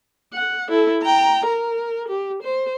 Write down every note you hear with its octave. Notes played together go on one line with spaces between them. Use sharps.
F#5
E4 A4
G5 A#5
A#4
G4
C5